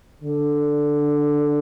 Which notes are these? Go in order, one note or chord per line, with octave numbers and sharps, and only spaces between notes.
D3